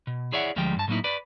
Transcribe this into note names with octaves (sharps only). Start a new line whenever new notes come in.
B2
E4 G#4 C#5 D5 E5 F#5
D2 F3 G3 G#3 G5
G2 A5
A2 F#3 A#3 D#4 E4
B4 D5 B5